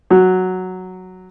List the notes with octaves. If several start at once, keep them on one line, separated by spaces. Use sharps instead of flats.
F#3